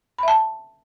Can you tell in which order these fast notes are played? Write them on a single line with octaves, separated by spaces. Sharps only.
B5 E5 A5